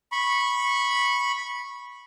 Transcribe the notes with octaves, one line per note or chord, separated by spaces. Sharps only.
B5 C#6